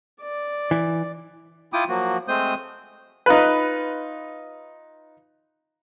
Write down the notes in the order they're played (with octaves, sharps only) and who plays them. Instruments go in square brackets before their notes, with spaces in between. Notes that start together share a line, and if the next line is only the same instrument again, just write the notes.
[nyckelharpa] D5
[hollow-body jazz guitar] E3
[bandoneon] E4 F4 G5 D6 D#6
F3 F#3 A#3 F#4
G#3 A3 C4 C5 D#6 G6
[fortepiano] D#4 F4 B4